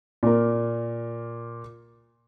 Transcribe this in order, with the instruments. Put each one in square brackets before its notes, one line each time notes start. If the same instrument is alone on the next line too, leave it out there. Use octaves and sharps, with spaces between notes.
[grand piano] A#2 A#4